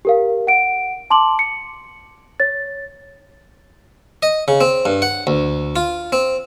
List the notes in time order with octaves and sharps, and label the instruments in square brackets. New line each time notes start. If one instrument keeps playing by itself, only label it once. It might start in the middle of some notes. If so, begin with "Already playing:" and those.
[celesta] G4 A#4 F5
F#5 D7
A5 C6 D6 F#7
C#7
C#5 A6
[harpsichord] D#5
C#3
C4
G2
F#5
D2
F4
C4